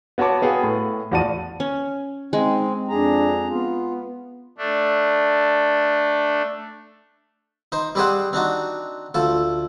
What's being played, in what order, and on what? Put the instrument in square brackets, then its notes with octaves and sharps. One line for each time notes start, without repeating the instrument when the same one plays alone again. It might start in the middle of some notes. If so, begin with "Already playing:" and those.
[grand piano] B3 F#4 C#5 A5 D6
B3 F#4 G#4 F5 G5
A2
E2 F3 F#4 D5 A5 D#7
[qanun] C#4
[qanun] G#3 [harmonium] C4 [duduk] D#4
[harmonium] F2 G#4 A#5 [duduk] D4
[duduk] B3 [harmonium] F4
[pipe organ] A3 D4
[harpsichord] D#4 C5
G3 C4 G4 G#4 C5 F#5
C4 D4 D#4 F#4
D2 F3 A4